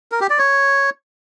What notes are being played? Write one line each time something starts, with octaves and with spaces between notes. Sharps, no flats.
A#4
G4
D5
C#5